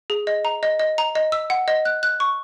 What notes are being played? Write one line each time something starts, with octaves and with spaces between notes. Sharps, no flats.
G#4
D#5
A#5
D#5
D#5
A#5
D#5
E6
F#5
D#5
F#6
F#6
C#6